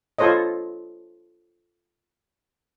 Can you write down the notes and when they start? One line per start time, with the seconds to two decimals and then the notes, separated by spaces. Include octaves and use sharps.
0.18 F4 A4 C5 C#5 D#5